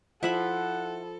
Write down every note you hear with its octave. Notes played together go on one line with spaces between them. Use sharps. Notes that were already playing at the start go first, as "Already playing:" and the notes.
F3 E4 A4 E5 F#5 B5